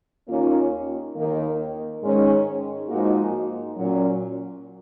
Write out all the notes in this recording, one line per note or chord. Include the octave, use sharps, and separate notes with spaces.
D#2 D#3 A#3 C#4 F4
D#2 D#3 A#3
G#2 D#3 G#3 C#4
G#2 F3 A#3 D#4 F#4
A#2 F#3 C#4